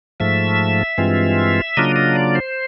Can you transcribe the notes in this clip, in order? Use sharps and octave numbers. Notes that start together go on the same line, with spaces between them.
G#2 F3 A3 E5
G2 E3 G#3 C4 F4
C#3 F#3 A#3 D4 F4 D#5
D#5
D5
C5